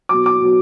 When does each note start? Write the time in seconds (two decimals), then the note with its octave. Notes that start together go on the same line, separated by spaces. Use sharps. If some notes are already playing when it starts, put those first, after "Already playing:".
0.09 B2 F#3 D6
0.26 D6
0.41 B2 F#3